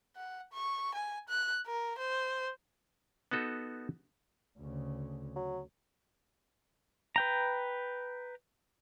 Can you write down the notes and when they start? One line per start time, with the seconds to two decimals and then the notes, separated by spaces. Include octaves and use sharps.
0.16 F#5
0.53 C#6
0.95 G#5
1.29 F#6
1.67 A#4
1.98 C5
3.31 B3 D#4 F#4 A4 B4
4.58 D2 C#3
5.36 F#3
7.16 B4 G5 A#5